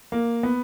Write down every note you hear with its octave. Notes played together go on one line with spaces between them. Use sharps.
A#3
B3